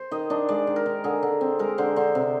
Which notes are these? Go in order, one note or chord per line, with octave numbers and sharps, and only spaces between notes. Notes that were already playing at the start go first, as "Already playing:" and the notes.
Already playing: C5
D#3 D#5
D4 D#5
G#3 D5
D#3
A#4
D#3
D3 G#4
D3
C4
G#3 A#4
D3 C5
D3 C5
C3